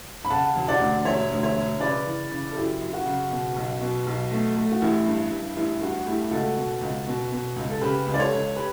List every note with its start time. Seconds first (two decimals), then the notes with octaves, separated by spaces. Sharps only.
0.25 B5
0.30 C#3 F#5 A5
0.55 E1
0.68 D5 F#5
0.80 D2
1.05 E1 C#5 E5
1.31 D2
1.43 C#5 E5
1.56 E1
1.80 C#3 B4 D5
2.06 E3
2.31 C#3
2.51 A4
2.55 F#2 E4 G4
2.81 F#2
2.93 F#4
3.06 C#3
3.31 B2
3.56 B1
3.81 B2
4.06 B1
4.31 A3
4.56 A3
4.71 F#4
4.81 A1 E4 G4
5.06 G2
5.31 G2
5.56 A1 E4 G4
5.81 G2 F#4
6.06 A3 E4 G4
6.31 C#2 F#4 A4
6.57 B2
6.81 C#2
7.07 B2
7.32 B2
7.56 C#2
7.70 A4
7.81 C#3 G4 B4
8.06 C#2
8.14 D5
8.19 A4 C#5
8.32 C#2
8.56 G4 B4